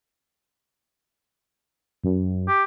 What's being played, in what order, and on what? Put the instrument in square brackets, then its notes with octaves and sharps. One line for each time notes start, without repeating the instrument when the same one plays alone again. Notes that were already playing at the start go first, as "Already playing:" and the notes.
[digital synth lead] F#2
[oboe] G4